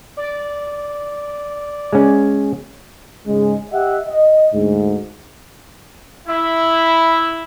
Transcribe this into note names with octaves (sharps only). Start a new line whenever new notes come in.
D5
G#3 C#4
G#2 C#3 G#3
G4 D#5 E5 F#5
D#5
D2 G#2
E4